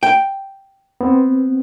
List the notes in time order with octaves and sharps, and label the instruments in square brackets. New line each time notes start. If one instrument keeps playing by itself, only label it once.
[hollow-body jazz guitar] G5
[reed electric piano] B3 C4